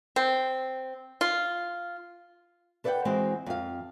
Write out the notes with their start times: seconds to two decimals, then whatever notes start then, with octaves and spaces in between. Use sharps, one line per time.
0.16 C4
1.21 F4
2.84 A4 B4 D5 E5 F#5 G5
3.05 E3 G#3 C4 F#4
3.46 F2 F5